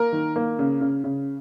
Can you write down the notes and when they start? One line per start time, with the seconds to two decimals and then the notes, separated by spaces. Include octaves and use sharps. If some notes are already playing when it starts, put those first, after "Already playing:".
Already playing: A#3 A#4
0.13 D#3
0.36 A#3
0.59 C#3
0.81 C#3
1.04 C#3